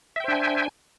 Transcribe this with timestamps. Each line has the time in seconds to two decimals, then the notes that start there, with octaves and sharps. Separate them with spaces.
0.16 E5
0.20 G5
0.24 C5
0.28 D4
0.32 G#5